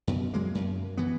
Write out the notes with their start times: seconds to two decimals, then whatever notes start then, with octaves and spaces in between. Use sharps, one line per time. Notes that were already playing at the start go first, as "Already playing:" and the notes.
0.07 F#2 B2
0.34 F#3 G#3 A#3
0.55 F#2
0.97 E3 B3